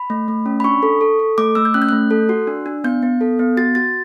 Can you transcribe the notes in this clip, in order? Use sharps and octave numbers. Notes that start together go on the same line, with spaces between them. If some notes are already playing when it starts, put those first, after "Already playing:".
Already playing: B5
A3
A3
C#4
B5
D4 C#6
A4
A4
A4
A3 D6
A3 E6
G6
C#4 F#6
G6
A3 F#6
A4
F#4
D4
D4
B3 G6
B3
A4
B3
F#4 A6
F#4 A6